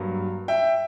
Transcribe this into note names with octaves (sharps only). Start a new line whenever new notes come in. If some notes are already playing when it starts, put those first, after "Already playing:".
Already playing: G2 F#3 A#3
E5 G5